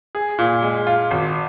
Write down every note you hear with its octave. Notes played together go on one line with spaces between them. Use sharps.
G#4
A#2
G#3
F4
G#1